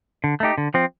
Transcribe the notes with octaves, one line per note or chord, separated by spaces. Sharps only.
D3
A3 D#4 G4
D3
F3 C4